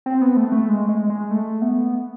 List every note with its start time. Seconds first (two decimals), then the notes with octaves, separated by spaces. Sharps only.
0.06 C4
0.21 B3
0.37 A3
0.52 A3
0.69 G#3
0.89 G#3
1.10 G#3
1.31 A3
1.62 B3